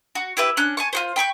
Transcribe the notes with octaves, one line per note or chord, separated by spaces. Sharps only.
F#4
E4 G4 B4 E5
C#4 D4 F#6
G#5 A5 C#6
F4 F#4 C5
G5 B5 C#6 G6